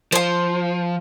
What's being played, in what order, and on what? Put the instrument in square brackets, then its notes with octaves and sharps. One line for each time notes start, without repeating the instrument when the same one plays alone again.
[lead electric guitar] F3 [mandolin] C5 C6